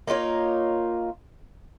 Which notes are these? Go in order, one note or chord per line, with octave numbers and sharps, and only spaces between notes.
A#3 D#4 F4 C#5